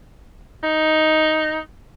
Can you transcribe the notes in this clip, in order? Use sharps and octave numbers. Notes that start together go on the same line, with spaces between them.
D#4